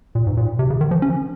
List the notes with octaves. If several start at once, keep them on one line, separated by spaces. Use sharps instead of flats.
A#2
G#2
A#2
C3
C#3
D#3
F3
C#4